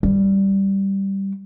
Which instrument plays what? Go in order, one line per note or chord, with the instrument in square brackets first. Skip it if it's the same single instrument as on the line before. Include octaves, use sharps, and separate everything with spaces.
[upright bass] G3